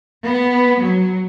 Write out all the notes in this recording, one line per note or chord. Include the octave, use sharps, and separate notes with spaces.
B3
F#3